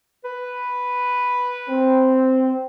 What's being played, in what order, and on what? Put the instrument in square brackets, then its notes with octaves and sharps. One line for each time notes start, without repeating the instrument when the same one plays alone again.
[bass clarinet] B4
[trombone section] C4